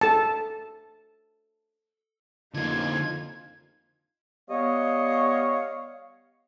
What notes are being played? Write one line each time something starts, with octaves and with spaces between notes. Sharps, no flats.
A4 A5
A1 F2 D3 A#3 D#4 F4 G#6
G3 B3 C#5 D#5 F5